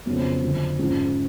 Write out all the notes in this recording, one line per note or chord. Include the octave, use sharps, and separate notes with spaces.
F2 C#3 F#3 B3
F2 D3 F#3
G#2 F3 G#3 C#4 F4